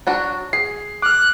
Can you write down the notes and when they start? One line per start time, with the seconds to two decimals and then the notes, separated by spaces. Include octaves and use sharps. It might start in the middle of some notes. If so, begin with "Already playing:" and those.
0.07 F#3 D4 F#4
0.53 G#4 C7
1.02 D6 F6 F#6